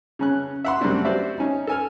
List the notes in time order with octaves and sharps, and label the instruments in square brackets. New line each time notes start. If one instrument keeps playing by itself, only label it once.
[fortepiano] C#3 C#4 F#6
E5 F#5 C6
F#2 G3 A3 C4 D4 F#4
F#4 G4 C5 D5 E5
C#4 D#4
A4 G#5 F6